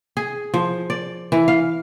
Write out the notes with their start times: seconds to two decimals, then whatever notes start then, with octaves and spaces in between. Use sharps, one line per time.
0.17 G#4
0.54 F3
0.90 D5
1.32 E3
1.48 F5